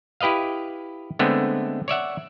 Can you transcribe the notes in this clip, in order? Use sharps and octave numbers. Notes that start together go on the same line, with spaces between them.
E4 G4 B4 D#5 F5
D3 G#3 A3 B3 C4
C#5 D5 E5 F#5